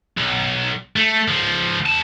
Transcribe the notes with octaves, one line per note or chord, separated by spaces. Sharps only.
B1
A3
C#2 F3
E2 A5